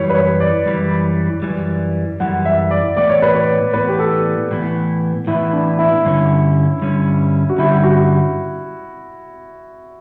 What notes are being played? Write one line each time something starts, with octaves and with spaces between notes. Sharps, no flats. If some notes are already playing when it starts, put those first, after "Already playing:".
Already playing: F#2 E3 G3 C#5
B4
C#5
D5
F#2 E3 G3
F#2 E3 G3
F#2 E3 G3 F#5
E5
D5
A2 E3 B3 D5
C#5
B4
C#5
A2 E3 B3 B4
G4
A4
A2 E3 B3
A2 E3 B3 E4
D4
E4
G2 D3 G3 C#4
G2 D3 G3 C#4
F#4
G2 D3 G3 C#4 E4
E4
F#4